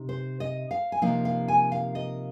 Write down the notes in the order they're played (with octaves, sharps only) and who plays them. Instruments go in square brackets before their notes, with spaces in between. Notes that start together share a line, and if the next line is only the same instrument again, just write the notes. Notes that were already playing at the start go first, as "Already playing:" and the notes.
Already playing: [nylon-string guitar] C3 D#4
C5
D#5
F5
G#5
C3 F3 A#3 D#4 F5
F5
G#5
F5
D#5